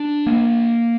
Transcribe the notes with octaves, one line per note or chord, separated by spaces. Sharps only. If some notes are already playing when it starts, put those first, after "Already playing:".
Already playing: D4
A#3